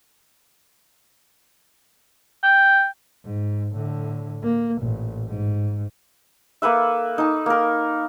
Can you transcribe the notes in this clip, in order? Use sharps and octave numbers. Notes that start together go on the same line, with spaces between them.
G5
G#2
A2 D3
A#3
A1 A#2
G#2
A#3 A4 B4 E5
D#4 A5
A#3 A#4